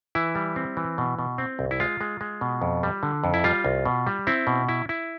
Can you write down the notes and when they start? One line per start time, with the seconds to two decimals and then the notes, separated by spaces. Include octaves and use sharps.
0.15 E3 E4
0.35 G3
0.56 C4
0.77 E3
0.98 B2
1.19 B2
1.38 C4
1.59 C2
1.71 E4
1.80 G#3 F4
2.01 G#3
2.21 G#3
2.41 B2
2.62 F2
2.83 G3
3.03 D3
3.24 F2
3.34 E4
3.44 G3 F4
3.65 C2
3.85 B2
4.07 G3
4.27 C4 E4
4.47 B2
4.69 E4
4.89 E4